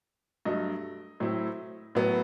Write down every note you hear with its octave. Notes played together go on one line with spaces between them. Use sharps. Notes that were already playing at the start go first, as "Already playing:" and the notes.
G2 F#3 A3 D#5
A2 F#3 C4 E4
A2 F#3 B3